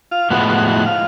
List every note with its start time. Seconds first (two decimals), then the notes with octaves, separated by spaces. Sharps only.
0.11 F4 F5
0.30 A2 F3 G#3 B3 E4 F#4 F#5
0.48 F#4 F#5
0.68 F#4 F#5
0.86 F4 F5